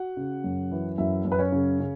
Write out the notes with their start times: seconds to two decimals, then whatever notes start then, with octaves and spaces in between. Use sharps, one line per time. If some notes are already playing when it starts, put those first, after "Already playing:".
Already playing: F#4 F#5
0.17 C#3
0.44 F#2
0.71 E3
0.98 F#2 E4 E5
1.25 F#2
1.32 B4
1.39 C#4 C#5
1.52 C#3
1.80 C#3